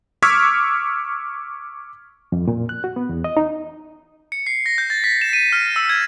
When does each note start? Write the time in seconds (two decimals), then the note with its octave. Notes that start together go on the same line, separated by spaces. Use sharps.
0.22 C#6 D6 E6 F6 G#6 B6
2.32 F2
2.48 A#2
2.69 F#6
2.84 F#4
2.96 B3
3.09 E2
3.24 D#5
3.37 D#4
4.32 C#7
4.47 C7
4.66 A#6
4.78 G6
4.90 A6
5.04 B6
5.21 E7
5.33 D#7
5.53 F6
5.76 E6
5.89 G#6